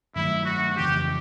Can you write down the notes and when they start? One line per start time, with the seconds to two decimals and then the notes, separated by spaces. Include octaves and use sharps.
0.16 G2 D#3 F#3 A3 E4
0.46 F#4
0.77 F2 C#3 E3 G4